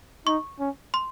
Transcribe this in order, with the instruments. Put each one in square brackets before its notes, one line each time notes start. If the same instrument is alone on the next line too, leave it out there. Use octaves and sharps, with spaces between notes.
[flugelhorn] D#4 [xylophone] C#6
[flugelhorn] C#4
[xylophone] C6